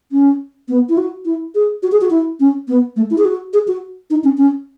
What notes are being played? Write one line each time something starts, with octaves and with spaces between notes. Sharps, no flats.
C#4
B3
E4
F#4
E4
G#4
F#4
G#4
F#4
E4
C#4
B3
A3
E4
G#4
F#4
G#4
F#4
D#4
C#4
C#4